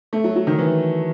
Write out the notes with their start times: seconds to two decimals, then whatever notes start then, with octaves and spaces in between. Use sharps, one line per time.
0.13 A3
0.24 F#3
0.36 F#3
0.47 D#3
0.58 E3